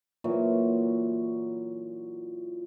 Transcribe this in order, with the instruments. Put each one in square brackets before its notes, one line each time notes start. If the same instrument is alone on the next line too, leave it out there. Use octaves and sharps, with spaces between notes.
[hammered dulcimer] A#2 E3 F#3